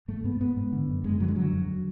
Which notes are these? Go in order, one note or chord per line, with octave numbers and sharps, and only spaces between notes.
G#2 A3
G#2 B3
G#2 B3
G#2
D3
F#2
F#2 G#3
D3 F#3
G#3
D3 F#3
F2